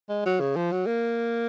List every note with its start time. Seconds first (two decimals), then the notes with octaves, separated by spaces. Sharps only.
0.09 G#3
0.25 F#3
0.40 C#3
0.56 F3
0.72 F#3
0.86 A#3